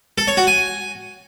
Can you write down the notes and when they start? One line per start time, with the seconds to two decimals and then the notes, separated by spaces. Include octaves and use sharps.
0.18 A4
0.27 C#5
0.37 F#4
0.47 G#5